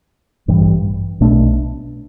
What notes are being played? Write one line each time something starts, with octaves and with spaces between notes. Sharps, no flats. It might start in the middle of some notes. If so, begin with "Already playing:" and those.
A1 G2 E3 G3
B1 B2 A3 D4